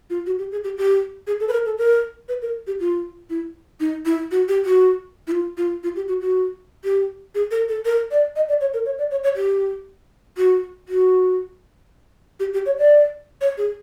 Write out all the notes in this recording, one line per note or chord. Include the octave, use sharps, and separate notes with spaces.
F4
F#4
G4
G#4
G4
G4
G#4
A4
B4
A#4
A4
A#4
B4
A#4
G4
F4
E4
D#4
E4
F#4
G4
F#4
E4
F4
F4
F4
G4
F#4
F#4
G4
G#4
A#4
A4
A#4
D5
D#5
D5
C#5
A#4
C#5
D5
C#5
C#5
G4
F#4
F#4
G4
G4
C#5
D5
C#5
G#4